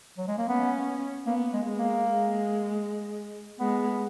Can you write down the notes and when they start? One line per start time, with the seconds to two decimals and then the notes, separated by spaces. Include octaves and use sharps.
0.18 F#3
0.28 G#3
0.38 A#3
0.49 B3 C#4
1.26 A#3 B3
1.53 G#3
1.66 G#3
1.78 A#3
2.05 G#3
3.60 G#3 B3